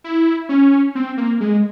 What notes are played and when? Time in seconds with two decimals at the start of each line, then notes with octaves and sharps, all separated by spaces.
0.04 E4
0.49 C#4
0.95 C4
1.17 A#3
1.41 G#3